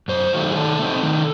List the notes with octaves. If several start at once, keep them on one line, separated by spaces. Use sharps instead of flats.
F#2 C5
D#3 F#3 A3
G#4
D#3 A4
A3 C4 D#4
D#3